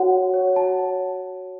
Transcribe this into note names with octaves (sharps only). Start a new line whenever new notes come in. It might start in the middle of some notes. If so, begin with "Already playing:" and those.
Already playing: F#4 C#5 F#5
F#4
C#5
F#4 A5
C#5